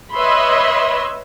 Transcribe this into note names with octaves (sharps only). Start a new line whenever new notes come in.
B4 C#5 D#5 E5 B5 C6